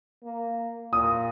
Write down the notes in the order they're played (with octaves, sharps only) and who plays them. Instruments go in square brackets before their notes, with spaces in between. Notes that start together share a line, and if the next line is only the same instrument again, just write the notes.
[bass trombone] A#3
[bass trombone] A#2 [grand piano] D#6